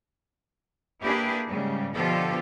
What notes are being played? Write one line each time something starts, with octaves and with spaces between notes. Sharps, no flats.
A#3 D4 E4 G4 G#4 B4
G#2 C#3 G3
B2 D3 F3 F4 G4 A4